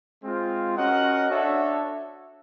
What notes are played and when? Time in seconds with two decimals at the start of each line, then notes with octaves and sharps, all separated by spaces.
0.23 G#3 C4 F4
0.76 C#4 F#4 A#4 D#5 F#5
1.29 D4 F#4 A4 C#5 E5